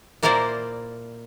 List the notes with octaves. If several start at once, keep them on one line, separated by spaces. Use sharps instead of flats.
A#2 A#3 E4 A#4 C5 D5